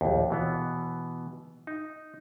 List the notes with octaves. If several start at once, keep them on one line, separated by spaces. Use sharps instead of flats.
A#1 D#2
B2 E3 B3
D#4